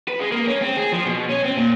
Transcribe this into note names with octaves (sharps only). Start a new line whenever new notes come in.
B4
G#3
A#3
C#4
C4
G#4
F3
B2
C#4
C4
A#2